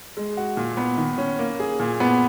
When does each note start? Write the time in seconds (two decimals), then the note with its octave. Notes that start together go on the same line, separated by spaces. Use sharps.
0.17 G#3
0.37 F#4
0.57 A#2
0.77 B3
0.97 D#3
1.18 C#4
1.39 A#3
1.60 G#4
1.80 A#2
2.00 B3